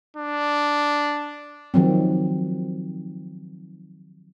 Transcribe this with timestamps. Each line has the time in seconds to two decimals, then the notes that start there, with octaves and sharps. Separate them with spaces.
0.16 D4
1.74 D#3 F3 F#3 C4